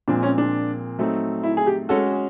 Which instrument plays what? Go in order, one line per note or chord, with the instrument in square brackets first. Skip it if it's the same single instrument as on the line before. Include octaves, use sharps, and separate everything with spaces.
[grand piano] A#2 F3 G#3 C4 [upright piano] D4
[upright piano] C#4
D4
[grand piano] F#3 A3 C4 D#4
[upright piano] E4
G#4
G4
[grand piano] G#3 C#4 F#4 [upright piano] A4
[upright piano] G#4